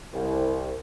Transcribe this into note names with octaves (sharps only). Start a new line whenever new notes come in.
C2